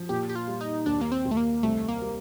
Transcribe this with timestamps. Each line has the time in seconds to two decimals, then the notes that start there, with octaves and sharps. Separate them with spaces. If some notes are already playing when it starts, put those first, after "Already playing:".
Already playing: F3
0.09 A#2 G4
0.29 G4
0.35 F4
0.48 G3
0.61 D#4
0.86 D#2 D4
1.01 A#3
1.12 C4
1.25 D#2
1.31 A3
1.37 A#3
1.63 C2 A3
1.88 A#3
2.02 G3